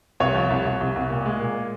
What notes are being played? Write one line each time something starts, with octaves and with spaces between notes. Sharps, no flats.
C2 C#5
F3
C2
C2
C2
C2
A#2
G#3
A#2